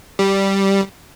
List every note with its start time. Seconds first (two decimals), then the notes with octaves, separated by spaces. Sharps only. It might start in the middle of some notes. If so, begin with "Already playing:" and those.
0.19 G3